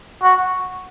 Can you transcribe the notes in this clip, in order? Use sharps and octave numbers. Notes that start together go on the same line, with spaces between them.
F#4